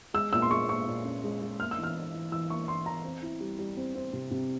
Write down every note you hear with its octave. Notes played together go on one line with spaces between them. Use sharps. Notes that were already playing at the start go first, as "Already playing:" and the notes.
G#3 E6
A#2 E6
C6
G#3 C#6
A#2 C#6
A#2
C#4
G#3
G#3
A#3 F6
E6
E3
F6
E4
E3
E3 E6
A#3 C#6
E3 C6
E3 A#5
C4
E4
G3
G3
C4
C4
C3
C3